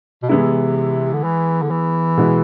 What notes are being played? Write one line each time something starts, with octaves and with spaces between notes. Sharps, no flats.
B2
C3 E3 G#3 B3 E4
D3
E3
D3
E3
B2 G#3 B3 E4